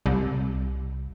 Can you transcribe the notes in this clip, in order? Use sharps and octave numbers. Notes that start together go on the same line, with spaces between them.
C2